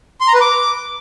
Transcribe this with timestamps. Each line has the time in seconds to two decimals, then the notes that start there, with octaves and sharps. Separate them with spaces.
0.21 C6
0.27 A#5
0.34 B4
0.41 D6